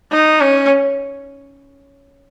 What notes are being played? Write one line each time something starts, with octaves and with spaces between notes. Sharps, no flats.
D#4
C#4